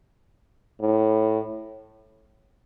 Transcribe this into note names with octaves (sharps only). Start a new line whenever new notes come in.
A2